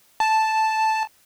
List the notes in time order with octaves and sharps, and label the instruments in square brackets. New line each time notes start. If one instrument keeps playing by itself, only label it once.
[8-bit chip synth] A5